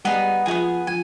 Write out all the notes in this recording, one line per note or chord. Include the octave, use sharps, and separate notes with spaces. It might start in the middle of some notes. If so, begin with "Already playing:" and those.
G3 B3 D#4 G#4
F3 D#4 G#4
B3
F3 G#5